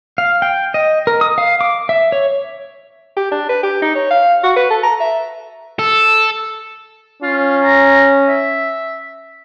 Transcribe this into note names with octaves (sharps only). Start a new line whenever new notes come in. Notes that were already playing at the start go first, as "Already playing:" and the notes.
F5
G5
D#5
A#4
D#6
F5
D6
E5
C#5
G4
D4
B4
G4
D#4
C#5
F5
F#4
B4
A4
A#5
E5
A4
C#4 F4
A#5
E5